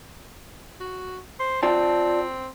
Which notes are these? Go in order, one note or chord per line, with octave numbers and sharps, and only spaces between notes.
F#4
C5
C4 F4 D5 A5